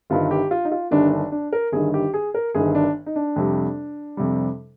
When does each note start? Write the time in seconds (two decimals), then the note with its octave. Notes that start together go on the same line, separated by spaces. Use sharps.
0.10 G1 G2 D#3 F4
0.31 G4
0.51 F4
0.65 D#4
0.72 F4
0.91 G1 G2 D#3 D4
1.12 D4
1.32 D4
1.53 A#4
1.72 G1 G2 D#3 G#4
1.94 G4
2.14 G#4
2.34 A#4
2.54 G1 G2 D#3 G#4
2.75 D4
3.06 D#4
3.16 D4
3.36 F2 C3 G3
4.17 F2 C3 G3